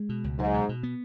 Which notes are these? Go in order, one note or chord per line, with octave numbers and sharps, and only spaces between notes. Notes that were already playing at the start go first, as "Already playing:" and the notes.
Already playing: G#3
B2
C#2
G#2 F#3
B2
B2
B3